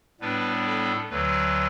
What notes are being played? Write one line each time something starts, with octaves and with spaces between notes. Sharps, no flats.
A2 G3 B3 D4 B4
A4
D2 D3 F#3 B4